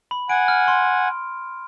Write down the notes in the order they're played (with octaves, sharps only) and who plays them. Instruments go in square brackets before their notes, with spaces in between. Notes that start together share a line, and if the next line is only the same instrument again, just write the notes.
[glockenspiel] B5
[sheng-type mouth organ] F#5 G#5 [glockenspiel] D7
[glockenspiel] F6
C6